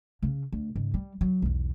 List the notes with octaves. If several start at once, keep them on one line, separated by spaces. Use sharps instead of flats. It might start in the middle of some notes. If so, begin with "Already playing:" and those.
C#3 C#4
D2
G#2 C#3
G3
F#3
B1 E2